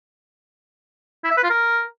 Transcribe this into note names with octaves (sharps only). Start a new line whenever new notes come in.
E4
E5
B4
F4
A#4